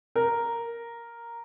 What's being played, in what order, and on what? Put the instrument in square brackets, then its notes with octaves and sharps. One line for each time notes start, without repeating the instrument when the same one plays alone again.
[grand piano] A#4